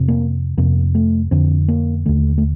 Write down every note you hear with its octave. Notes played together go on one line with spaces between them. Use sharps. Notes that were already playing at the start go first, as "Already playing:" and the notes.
Already playing: F2 C3
A#3
F2 C3 A#3
A3
F2 D3 C4
A#3
D#2 D3 A3
A3